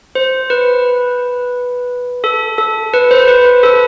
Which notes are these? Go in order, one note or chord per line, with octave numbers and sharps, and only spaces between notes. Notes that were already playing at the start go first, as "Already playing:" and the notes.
C5
B4
A4
A4
B4
C5
B4
B4
A4